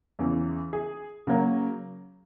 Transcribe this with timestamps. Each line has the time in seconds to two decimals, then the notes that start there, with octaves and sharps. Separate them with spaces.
0.19 E2 C#3 E3
0.73 G#4
1.27 C#3 F#3 A#3 C#4